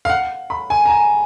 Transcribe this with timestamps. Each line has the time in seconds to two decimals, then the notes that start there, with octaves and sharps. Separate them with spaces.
0.05 F5
0.10 F#5
0.50 B5
0.70 G#5
0.86 A#5
0.90 G#5